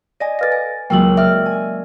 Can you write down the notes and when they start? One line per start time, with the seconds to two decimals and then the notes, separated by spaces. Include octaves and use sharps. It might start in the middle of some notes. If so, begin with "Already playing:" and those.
0.20 D5 D#5 G#5 A#6 D#7
0.39 A4 B4 F5 A6 A#6
0.52 G#5
0.90 C#2 F#3 A#3 G5 E6 F#7
1.17 D5 E5 F6
1.46 G#5